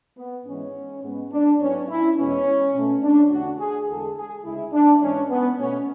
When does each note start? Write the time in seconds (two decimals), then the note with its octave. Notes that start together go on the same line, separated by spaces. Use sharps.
0.18 B3
0.46 G#2 E3 G#3 B3 C#4
1.03 G#2 G#3 B3
1.32 D4
1.60 A2 F#3 B3 C#4
1.89 E4
2.17 E2 B2 G#3 B3 C#4
2.74 B2 A3
3.03 D4
3.31 E2 D3 A3 F#4
3.59 G#4
3.88 E2 D3 G#3 A4
4.17 G#4
4.45 D2 C#3 G#3 E4
4.73 D4
5.02 G#2 E3 G#3 C#4
5.30 B3
5.58 B2 A3 C#4